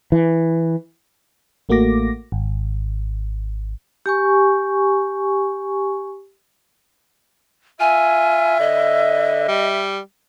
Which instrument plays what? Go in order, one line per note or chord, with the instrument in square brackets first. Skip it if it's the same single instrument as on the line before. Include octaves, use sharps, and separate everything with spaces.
[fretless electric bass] E3
[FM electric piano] A1 A3 A#3 F#4 D6 A#6
G#1
[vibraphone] G4 G#5 C#6
[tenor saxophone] F4 [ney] E5 [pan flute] G#5
[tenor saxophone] D3 [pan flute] D#5
[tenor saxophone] G3